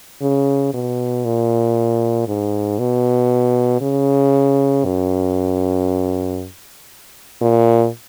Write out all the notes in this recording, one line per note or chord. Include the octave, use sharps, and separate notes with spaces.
C#3
B2
A#2
G#2
B2
C#3
F#2
A#2